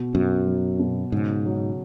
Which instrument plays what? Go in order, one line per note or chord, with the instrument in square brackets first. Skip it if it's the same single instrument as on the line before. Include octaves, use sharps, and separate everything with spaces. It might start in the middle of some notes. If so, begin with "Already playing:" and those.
Already playing: [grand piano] B2
[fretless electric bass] F#2 [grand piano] B2
[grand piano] F#3
B2
[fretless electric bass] G#2 [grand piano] C#3
[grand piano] F#3